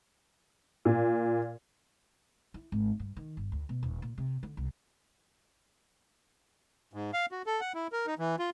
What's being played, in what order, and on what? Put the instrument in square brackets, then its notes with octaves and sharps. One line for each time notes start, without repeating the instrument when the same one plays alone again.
[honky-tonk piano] A#2
[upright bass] E4
G#1
G2
D#3
G1
D2
B2
D#1
A#2
C3
D3
C2
[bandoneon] G#2
F5
F#4
A4
F#5
E4
A#4
D#4
E3
F4